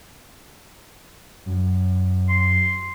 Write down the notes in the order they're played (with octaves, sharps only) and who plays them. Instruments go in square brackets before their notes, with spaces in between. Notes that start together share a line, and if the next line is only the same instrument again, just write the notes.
[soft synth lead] F#2
[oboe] C6